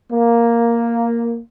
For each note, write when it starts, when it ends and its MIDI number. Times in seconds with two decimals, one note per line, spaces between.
0.11 1.38 58